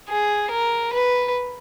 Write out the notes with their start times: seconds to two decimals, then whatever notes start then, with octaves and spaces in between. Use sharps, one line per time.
0.09 G#4
0.51 A#4
0.93 B4